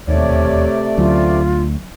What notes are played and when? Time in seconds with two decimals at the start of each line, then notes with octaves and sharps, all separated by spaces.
0.08 E1 D#2 C3 A3 C#5 D5
0.98 D2 F#3 C#4 F4